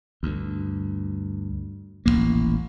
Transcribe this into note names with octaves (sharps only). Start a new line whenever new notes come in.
D2 G2
D#1 A1 G#2 A#3